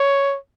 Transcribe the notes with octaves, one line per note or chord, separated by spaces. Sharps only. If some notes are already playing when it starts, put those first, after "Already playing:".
Already playing: C#5